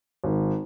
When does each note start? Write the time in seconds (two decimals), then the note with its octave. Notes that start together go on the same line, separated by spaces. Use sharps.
0.24 G#1